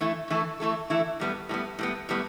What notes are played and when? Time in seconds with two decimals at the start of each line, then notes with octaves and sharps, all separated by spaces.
0.01 E3 A3 E4 A4
0.30 E3 A3 E4 A4
0.60 E3 A3 E4 A4
0.90 E3 A3 E4 A4
1.20 A2 G3 B3
1.49 A2 G3 B3
1.79 A2 G3 B3
2.09 A2 G3 B3